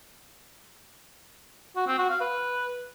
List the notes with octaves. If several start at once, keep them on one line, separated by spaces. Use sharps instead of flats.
F#4
C4
F#4
F5
B4